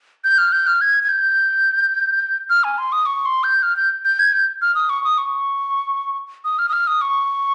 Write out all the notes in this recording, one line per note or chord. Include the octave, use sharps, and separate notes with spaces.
G6
F6
G6
F6
G#6
G#6
G6
F6
G#5
C6
D#6
C#6
C6
G6
F6
G6
G6
G#6
G6
F6
D#6
C#6
D#6
C#6
D#6
F6
D#6
F6
D#6
C#6